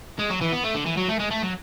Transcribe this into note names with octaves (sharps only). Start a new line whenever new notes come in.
G#3
F#3
E3
B3
A3
D3
E3
F#3
A3
G#3
A3
F#3